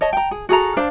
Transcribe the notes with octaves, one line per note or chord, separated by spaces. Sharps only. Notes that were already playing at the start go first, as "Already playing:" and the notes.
C#5 D#5 A5
G5 A#5
G#4
F#4 G#4 A4 A#5
D4 C5 F5